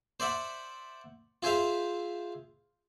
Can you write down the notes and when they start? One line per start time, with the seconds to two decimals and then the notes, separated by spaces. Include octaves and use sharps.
0.20 C5 D5 E5 F#5
1.43 F4 G#4 C5 E5 F5